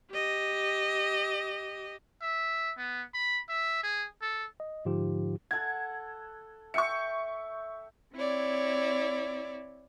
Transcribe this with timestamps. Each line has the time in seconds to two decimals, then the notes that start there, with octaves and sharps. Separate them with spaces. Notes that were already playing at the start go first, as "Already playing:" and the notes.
0.11 G4 D#5
2.22 E5
2.77 B3
3.14 B5
3.49 E5
3.83 G#4
4.22 A4
4.60 D#5
4.85 G#2 D3 F3 D#4 F4 G4
5.51 A4 F#5 G#6
6.74 E5 G5 C#6 C#7
8.14 C4 E4 C#5 D5